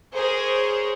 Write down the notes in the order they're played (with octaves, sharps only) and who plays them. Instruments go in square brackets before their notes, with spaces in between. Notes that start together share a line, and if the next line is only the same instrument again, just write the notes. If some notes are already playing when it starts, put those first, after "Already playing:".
[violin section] G#4 A#4 C5 C#5